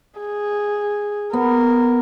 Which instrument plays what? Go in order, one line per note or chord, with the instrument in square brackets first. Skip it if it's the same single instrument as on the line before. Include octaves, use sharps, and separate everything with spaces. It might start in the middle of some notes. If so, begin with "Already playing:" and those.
[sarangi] G#4
[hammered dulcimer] B3 [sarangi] A#4